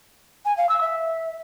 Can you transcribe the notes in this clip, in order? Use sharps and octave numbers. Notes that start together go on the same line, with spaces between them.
G#5
F5
E6
E5